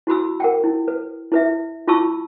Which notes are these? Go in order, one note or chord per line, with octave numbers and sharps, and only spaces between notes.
E4 F#4 B5 E6
A#4 F#5 G5
E4
B4
E4 B4 E5
E4 F4 A5 B5 C#6 E6